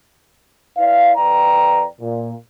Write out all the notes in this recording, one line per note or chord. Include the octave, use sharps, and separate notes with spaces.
E4 B4 D5 F5
F2 B4 D5 G5 A#5
A#2